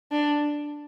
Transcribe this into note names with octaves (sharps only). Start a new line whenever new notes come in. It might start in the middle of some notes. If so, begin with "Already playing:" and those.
D4